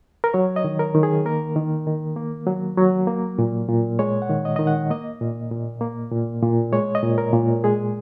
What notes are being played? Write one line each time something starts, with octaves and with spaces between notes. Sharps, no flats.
A#4
F#3 C#5
D#5
D#3
A#4
D#3
G#4
A#3 A#4
D#3
D#3
A#3
F#3
F#3
A#3
A#2
A#2
G#3 C#5
F#5
D#3
D#5
D#3 D#5
F#5
A#3 D#5
A#2
A#2
A#3
A#2
A#2
G#3 C#5
D#5
A#2
A#4
A#2
G#3 G#4